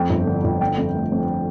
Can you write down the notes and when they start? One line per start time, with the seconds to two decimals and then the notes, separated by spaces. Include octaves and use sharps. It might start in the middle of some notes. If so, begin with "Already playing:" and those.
Already playing: F2 G5
0.10 G1
0.27 D3
0.44 G1
0.61 D3 G5
0.78 F2
0.95 A3
1.12 F2